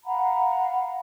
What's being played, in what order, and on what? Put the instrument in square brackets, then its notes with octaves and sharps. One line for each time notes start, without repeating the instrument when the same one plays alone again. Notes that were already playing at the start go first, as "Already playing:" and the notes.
[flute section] F5 F#5 A#5 B5